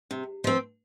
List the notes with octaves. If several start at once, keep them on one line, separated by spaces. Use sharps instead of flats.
C3
F3 C4